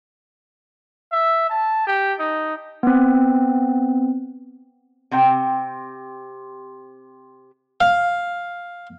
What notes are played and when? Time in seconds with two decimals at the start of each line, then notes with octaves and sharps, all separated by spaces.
1.12 E5
1.50 A5
1.87 G4
2.19 D#4
2.83 B3 C4
5.11 C3 C4 G4 G5
7.81 F5